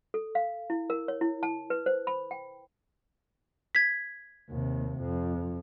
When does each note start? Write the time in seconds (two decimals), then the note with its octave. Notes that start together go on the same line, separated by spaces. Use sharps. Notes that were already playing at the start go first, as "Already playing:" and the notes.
0.14 A4
0.35 F5
0.70 E4
0.90 A#4
1.08 C#5
1.21 E4
1.43 A5
1.70 B4
1.86 C5
2.07 B5
2.31 G5
3.75 G#6 B6
4.50 D#2 C3
5.01 F2